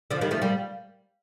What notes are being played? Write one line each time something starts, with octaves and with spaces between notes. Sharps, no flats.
D3 F3
D#3 G3
F3 A3
G3 A#3